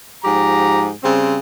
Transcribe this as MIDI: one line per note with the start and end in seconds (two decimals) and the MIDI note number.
0.24 0.89 44
0.24 0.89 53
0.24 0.89 67
0.24 0.89 82
1.03 1.36 49
1.03 1.36 55
1.03 1.36 60